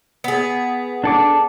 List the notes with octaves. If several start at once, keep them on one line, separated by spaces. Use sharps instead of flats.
B3 G#4
D4 A4 D6